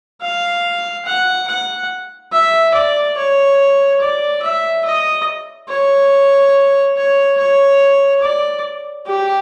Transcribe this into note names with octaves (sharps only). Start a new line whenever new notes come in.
F5
F#5
F#5
E5
D5
C#5
D5
E5
D#5
C#5
C#5
C#5
D5
G4